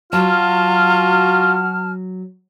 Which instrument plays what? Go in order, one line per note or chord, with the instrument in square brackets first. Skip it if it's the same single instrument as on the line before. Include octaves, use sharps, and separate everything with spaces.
[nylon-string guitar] F#3 [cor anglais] F4 [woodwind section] F#4 F6 [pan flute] A5